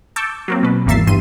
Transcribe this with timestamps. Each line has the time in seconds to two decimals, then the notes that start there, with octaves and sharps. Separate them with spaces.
0.16 A5 C#6 D6 E6 G6
0.48 F#3 A#3 C4
0.63 B2 B4
0.86 G#1 E2 A#3 E5 A6 C7
1.07 E2 G2 C6 D#7